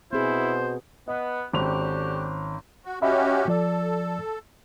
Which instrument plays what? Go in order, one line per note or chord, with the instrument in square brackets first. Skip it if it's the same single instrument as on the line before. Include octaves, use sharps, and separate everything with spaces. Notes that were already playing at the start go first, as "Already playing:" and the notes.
[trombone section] B2 [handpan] C4 G#4 [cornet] E4 [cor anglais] C5
[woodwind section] B3 [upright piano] D#5
[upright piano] G#1 C#4 F7 [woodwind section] D3 F#4 G4
[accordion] F#4
[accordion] C#4 F#4 G4 [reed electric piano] D#5 E5 B5
[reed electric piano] F3 D5 [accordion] A4